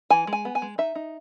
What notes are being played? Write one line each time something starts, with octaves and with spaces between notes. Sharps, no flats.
E3 G#5
G#3
G#5
B3
G#5
G#3
D#4 E5
D#4